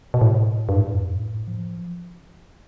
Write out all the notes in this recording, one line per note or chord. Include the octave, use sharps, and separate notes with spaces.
B2
A2
G2
A2
G2
F2
A2
F3